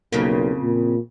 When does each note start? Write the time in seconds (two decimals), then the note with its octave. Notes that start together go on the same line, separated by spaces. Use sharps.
0.12 B1 F2 C#3 A#3
0.63 A#2